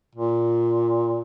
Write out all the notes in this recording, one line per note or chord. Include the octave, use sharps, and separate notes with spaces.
A#2